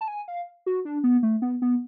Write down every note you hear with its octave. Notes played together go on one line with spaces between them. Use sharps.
A5
G#5
F5
F#4
D4
B3
A3
B3
B3